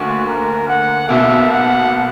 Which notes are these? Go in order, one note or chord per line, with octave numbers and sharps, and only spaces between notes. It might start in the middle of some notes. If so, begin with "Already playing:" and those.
Already playing: D2 D3 A#3 F#4
A#4
F#5
B1 B2 A#3 E5
F#5